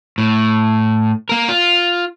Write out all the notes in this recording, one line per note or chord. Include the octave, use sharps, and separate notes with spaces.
A2
A#3 A#4
F4